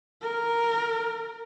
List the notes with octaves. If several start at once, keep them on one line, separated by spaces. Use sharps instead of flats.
A#4